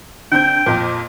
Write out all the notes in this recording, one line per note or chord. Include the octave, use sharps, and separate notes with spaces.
D3 C4 G5 G6
F2 A#2